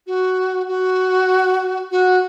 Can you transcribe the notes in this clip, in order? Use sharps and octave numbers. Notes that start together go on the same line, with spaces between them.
F#4
F#4
F#4